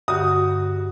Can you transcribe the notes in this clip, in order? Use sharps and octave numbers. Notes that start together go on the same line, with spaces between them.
G2 D3 F#4 G4 D#6